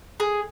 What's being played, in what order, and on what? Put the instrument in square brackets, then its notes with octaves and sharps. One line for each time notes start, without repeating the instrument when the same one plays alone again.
[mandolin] G#4